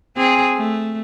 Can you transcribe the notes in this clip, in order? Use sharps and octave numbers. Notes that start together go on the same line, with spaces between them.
C4 G#4
A3